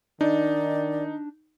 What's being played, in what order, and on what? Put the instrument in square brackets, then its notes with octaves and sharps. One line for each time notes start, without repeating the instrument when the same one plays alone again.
[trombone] D#3 [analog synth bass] D4 [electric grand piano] D#4 [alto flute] D5